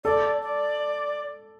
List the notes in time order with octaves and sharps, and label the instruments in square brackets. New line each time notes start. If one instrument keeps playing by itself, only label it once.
[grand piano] A4 [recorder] D5
[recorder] D5